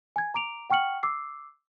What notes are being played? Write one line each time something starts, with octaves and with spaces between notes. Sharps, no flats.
G#5 G#6
A#5 D6 D7 F7
F#5 G5 C#6 F6 C#7 F#7
D6 E6 C7